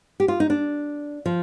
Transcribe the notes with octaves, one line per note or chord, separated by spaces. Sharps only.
G4
F4
D#4
D4
F3